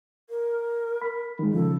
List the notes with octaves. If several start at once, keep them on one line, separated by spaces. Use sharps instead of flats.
A#4
B5
D#3 G#3
C#3 F3 A4